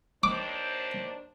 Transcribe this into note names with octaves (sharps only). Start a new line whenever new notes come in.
D#2 D4 C5 D6